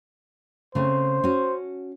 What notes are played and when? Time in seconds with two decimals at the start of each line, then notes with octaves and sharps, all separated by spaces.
0.75 C#3 A3 C4 C5
1.24 C#4 F#4